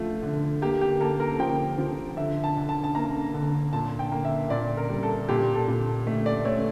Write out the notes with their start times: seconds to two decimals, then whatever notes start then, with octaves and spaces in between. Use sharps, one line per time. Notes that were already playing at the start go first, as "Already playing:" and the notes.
Already playing: F3 A3 F4
0.23 D3
0.62 A#3 G4
0.81 G4
1.00 A#3 A4
1.20 A#4
1.39 F3 G5
1.78 F3
2.17 D3 E5
2.44 A5
2.57 D3
2.69 A5
2.84 A5
2.95 A#3 A#5
3.34 D3
3.73 A#2 A5
3.99 G5
4.12 A#3
4.25 E5
4.50 A#2 D5
4.77 A#4
4.90 G3
5.03 A4
5.28 A#2 G4
5.55 A4
5.68 A#2
6.07 A3
6.26 D5
6.45 A3 C#5